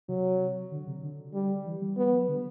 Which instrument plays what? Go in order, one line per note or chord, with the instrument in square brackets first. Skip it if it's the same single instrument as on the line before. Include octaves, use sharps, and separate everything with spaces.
[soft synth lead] C3 [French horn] F#3
[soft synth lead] D3
C3
D3
[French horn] G3
[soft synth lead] E3
G3
[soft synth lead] G3 [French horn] B3
[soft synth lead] F#3
D3